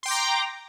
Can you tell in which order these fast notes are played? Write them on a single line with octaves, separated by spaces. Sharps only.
C6 G5 D6 A#5